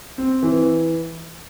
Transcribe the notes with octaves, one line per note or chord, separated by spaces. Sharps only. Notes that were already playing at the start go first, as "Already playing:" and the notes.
C4
E3